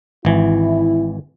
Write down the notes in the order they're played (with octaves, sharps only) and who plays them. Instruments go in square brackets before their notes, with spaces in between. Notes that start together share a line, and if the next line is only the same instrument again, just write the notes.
[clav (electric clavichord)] G#1 E3 [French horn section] E4